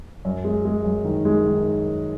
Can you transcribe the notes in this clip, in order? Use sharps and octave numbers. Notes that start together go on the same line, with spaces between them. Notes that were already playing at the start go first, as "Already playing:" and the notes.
F#2
G#3
G#3
F#2
D#3
G#3
D#3